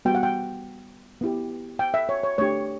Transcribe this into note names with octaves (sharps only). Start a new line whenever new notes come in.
G3 B3 F#4 G5
F#5
G5
B3 E4 G4
G5
E5
C#5
C#5
A3 D4 G4 C#5